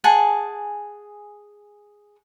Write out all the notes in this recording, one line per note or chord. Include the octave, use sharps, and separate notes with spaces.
G#4 F#5 G#5 A5